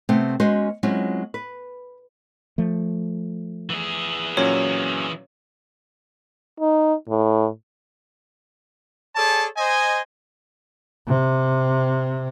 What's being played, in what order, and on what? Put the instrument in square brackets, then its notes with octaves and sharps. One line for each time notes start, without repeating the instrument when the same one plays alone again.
[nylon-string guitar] C3 A3 B3 C4
G#3 C#4 F#4 B4 C5
F#3 G#3 C4 C#4 E4 F4
B4
[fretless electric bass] F3 A3
[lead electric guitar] E3 G#4
[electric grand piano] A#2 F#3 C#4 [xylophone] C#5
[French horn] D#4
A2
[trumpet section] G#4 A4 C#5 D5 G#5 A5
C5 D#5 G#5
[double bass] C3